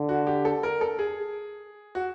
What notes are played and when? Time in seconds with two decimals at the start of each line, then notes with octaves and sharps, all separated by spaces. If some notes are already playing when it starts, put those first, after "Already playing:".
Already playing: D3
0.09 F#4
0.27 G4
0.45 A4
0.63 A#4
0.81 A4
0.99 G#4
1.95 F#4